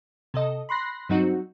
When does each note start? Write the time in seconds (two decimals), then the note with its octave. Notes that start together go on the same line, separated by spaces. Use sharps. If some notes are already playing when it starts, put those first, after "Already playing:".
0.34 C3 A4 D#5
0.69 B5 C6 F#6 A#6 C7
1.09 G2 F#3 C4 D#4 F#4